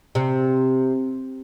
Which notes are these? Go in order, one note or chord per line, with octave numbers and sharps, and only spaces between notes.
C3